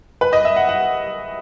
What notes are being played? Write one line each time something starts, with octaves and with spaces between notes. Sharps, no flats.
B4
D#5
E5
F#5
F#5